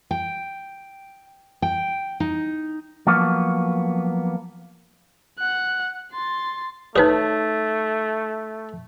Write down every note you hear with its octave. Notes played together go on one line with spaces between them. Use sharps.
G5
G5
D#4
F3 F#3 A#3 B3
F#5 F#6
C6 A6
A3 D#4 G#4 B4 C#5